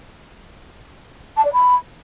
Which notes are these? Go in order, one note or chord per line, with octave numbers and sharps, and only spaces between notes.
A5
D5
B5